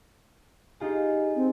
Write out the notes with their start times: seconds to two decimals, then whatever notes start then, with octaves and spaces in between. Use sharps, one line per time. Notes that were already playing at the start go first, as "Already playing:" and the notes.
0.80 D#4 F4 G4 G#4
1.36 C4